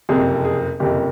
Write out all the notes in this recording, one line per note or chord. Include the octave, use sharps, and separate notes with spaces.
F#1 F2 C3 G#4
G#4
F#1 F2 C3 G4